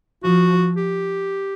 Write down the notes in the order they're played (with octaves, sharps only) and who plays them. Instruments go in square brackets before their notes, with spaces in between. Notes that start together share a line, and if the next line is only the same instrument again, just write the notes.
[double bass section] F3 [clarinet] F#4
[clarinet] G4